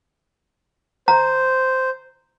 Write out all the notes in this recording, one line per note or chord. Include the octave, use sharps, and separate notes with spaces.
C5 A#5